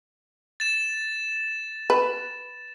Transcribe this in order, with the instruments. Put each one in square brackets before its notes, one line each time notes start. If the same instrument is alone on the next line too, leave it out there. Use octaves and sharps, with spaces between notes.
[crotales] A6 E7
[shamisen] B4